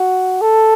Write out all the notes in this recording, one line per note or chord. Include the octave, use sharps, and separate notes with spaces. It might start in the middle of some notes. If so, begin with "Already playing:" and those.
Already playing: F#4
A4